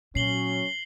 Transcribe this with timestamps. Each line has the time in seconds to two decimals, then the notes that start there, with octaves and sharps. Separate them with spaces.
0.15 A#2 F#3 C#4 C7 F#7 G7